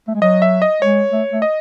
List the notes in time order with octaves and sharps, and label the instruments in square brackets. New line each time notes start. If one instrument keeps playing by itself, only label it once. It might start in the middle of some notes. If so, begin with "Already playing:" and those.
[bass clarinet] A3
G#3
[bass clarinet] F#3 [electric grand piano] D#5
[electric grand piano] E5
D#5
[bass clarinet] G#3 [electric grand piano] C#5
[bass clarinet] A3
A3
[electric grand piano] D#5